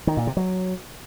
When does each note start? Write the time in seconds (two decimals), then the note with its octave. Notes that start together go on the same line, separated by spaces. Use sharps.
0.07 D#3
0.17 A#2
0.27 C3
0.37 F#3